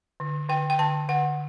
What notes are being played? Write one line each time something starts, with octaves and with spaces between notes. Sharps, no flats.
D3
D3 G5
G5
D3 A5
D3 F#5